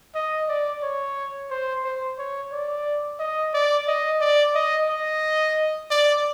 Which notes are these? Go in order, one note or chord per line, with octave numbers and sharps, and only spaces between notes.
D#5
D5
C#5
C5
C5
C#5
D5
D#5
D5
D#5
D5
D#5
D#5
D5